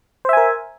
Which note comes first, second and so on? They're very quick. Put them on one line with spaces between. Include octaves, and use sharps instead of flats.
C5 E5 G#5 A#4